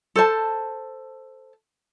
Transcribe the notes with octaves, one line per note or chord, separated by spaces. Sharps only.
A4 C5 A5